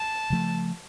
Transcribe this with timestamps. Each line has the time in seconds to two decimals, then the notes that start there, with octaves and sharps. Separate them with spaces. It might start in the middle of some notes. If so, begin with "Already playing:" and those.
Already playing: A5
0.30 C#3 F3 A3